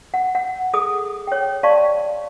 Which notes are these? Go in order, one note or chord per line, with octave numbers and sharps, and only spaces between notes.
F#5
F#5
G#4 A4 D6 D#6
C#5 G5
D5 F5 A5 C6 C#6